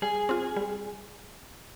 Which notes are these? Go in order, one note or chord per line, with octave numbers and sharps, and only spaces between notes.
G3 G#4
C4 F4
G3